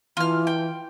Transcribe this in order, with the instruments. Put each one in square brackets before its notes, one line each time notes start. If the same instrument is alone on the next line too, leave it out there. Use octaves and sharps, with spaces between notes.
[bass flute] E3 [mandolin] F4 F6
[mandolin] G5